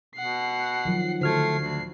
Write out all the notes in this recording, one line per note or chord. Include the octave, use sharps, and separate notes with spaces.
B2 F#5 C7
D#3 F3 F#3
D3 A3 F#4 C5 F6 G#6 C7
D2